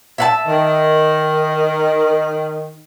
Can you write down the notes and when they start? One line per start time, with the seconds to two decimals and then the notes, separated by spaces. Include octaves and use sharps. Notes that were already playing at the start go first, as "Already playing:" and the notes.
0.18 E5 F#5 A5
0.46 D#3